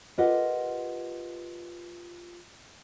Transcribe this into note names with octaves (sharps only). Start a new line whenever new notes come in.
F4 G4 A#4 B4 D#5 F#5